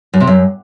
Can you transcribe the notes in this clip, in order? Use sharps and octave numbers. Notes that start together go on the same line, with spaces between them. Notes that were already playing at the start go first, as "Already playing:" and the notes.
F#2
C3
F#2